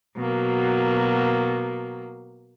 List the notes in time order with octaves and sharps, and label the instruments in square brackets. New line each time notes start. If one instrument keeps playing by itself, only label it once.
[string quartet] B2 F#3 A#3